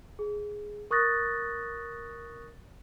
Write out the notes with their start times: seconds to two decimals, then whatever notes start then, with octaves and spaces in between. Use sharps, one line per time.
0.19 G#4
0.91 A#4 C#6 D#6 F#6 A6 A#6